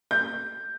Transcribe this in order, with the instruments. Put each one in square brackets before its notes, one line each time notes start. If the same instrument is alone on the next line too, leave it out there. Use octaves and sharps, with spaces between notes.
[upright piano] G6